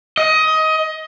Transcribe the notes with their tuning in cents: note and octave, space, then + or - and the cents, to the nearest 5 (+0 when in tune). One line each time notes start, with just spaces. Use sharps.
D#5 +20